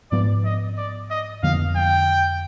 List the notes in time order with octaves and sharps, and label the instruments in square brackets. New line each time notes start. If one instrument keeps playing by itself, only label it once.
[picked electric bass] G#2 F3 B3 [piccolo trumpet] D5
[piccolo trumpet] D#5
D5
D#5
[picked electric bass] F2 D3 F3 B3 [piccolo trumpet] F5
[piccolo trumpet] G5